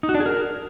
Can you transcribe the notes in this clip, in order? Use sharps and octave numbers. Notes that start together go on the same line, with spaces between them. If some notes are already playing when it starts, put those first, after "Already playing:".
D#4
F#4
D4
G#4
A#4